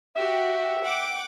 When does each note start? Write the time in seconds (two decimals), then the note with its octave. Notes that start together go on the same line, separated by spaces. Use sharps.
0.16 F#4 G4 E5
0.83 F#5 G5 D6